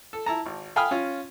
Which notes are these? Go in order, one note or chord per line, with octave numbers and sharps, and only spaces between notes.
A4
E4 A5 A#5
G#1
F5 G5 G#5 B5 D#6 F6
C#4 F4